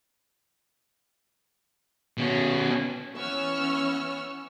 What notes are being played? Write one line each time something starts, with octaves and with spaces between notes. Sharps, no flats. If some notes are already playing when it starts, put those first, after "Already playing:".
B2 C#4
E3 B3 C#4 C#6 E6 F6